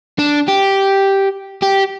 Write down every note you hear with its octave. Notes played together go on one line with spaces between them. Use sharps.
D4
G4
G4